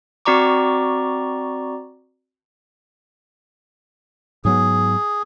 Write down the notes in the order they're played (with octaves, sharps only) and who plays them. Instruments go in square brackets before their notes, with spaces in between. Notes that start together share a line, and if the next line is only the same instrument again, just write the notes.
[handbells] C4 F#4 D5 A#5 C#6 D6
[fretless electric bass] G#2 F#3 B3 [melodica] G#4